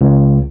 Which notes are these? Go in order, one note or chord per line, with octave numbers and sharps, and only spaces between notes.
C#2